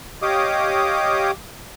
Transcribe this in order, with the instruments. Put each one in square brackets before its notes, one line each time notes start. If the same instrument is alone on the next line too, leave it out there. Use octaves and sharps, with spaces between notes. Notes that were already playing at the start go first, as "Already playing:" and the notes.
[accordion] G4 C#5 D#5 F5 D6 D#6